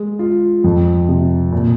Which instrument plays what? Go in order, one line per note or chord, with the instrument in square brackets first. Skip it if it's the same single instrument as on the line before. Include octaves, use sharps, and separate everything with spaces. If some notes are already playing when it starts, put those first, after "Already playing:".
Already playing: [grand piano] G#3
F4
F2
C3
A#2